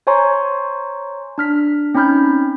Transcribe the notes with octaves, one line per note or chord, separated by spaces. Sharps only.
C5 C#5 G#5 A#5 C6 C#6
D4 F6 B6
C4 C#4 D#4 B5 F6 G6